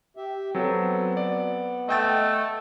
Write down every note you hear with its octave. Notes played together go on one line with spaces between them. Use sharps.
G4 E5
F#3 B3 C4 A4
D5
A3 D#5 G5 A6